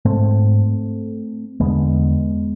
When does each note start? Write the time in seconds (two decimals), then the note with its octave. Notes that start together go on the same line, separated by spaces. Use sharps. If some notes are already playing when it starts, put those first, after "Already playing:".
0.05 G#2 A3 C4
1.60 E2 D3 G#3 B3